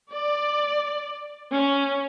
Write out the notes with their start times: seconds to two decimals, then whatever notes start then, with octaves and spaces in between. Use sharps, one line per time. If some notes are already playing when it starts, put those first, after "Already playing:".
0.11 D5
1.55 C#4